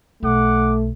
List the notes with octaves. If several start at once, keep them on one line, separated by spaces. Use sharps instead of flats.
B1 A3 F#5 D6